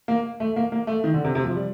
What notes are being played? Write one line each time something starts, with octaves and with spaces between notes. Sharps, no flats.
A#3
A3
A#3
A#3
A3
D#3
D3
C3
C3
F3
G3